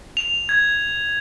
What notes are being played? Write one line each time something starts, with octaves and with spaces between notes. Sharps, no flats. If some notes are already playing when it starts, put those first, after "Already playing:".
F7
G#6